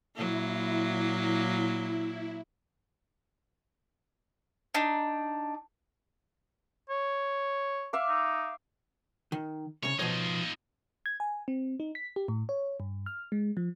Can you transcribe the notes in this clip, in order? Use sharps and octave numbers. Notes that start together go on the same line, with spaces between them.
A#2 F#3 A#3 E4
D4 D#4
C#5
E5 F5 D6
D#4
D#3
C2 C#3 C#5
B2 F3 D#4 F4 C#5
G#6
G#5
C4
D#4
B6
G4
A2
C#5
G2
F6
G#3
F3